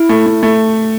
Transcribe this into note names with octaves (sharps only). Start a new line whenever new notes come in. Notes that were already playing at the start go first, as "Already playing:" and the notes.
Already playing: E4
A3
A3
A3